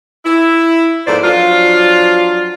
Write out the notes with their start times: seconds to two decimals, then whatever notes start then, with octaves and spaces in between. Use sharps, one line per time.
0.24 E4
1.07 G#2 F3 A3 B3 C5 D5
1.23 F3 F#3 D4 F4